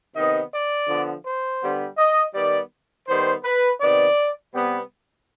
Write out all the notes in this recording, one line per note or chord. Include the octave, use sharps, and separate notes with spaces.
C3 D#3 B3 D#5
D5
D3 F3 B3
C5
D3 G3 B3
D#5
D#3 G3 B3 D5
D#3 G3 B3 C5
B4
C3 D#3 B3 D5
C3 G3 B3